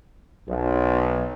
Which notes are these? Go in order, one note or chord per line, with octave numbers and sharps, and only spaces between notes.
B1